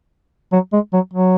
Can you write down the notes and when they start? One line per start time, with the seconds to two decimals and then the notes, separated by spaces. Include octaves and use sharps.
0.52 F#3
0.73 G#3
0.93 F#3
1.13 F#3